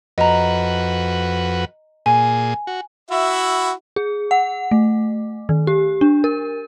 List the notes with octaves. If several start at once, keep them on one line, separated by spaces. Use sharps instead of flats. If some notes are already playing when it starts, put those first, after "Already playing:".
F2 F#4 B4 D#5 A#5
A#2 G#4 G#5
F#4
E4 F#4 E5
G#4
F#5
A3
D#3
G4
D4
A#4